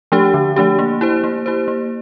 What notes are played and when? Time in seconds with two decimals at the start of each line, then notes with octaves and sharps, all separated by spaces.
0.12 F3 A3 D4 G4
0.34 D3
0.56 F3 A3 D4 G4
0.79 A#3
1.01 E4 G4 C5
1.24 A#3
1.46 E4 G4 C5
1.68 A#3